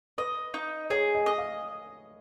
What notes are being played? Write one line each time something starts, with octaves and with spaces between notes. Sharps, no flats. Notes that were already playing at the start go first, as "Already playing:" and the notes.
B4 D#5
D#4
G#4 C#5
D#5
D#5
F5